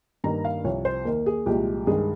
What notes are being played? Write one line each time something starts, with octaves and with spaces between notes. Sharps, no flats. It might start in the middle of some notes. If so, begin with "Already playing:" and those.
G2 D#3 A#3 A#5
F5
C2 C3 F3 C#5
C5
D#2 D#3 A#3 A#4
G#4
C2 A#2 F3 G#3 G4
G2 D#3 G#3 G#4